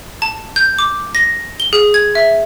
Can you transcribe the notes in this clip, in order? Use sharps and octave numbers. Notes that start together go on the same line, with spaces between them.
A5
G6
D6
A#6
G7
G#4
G#6
E5